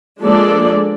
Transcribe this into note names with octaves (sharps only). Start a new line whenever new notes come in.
F3 G#3 A#3 D4 A4 D5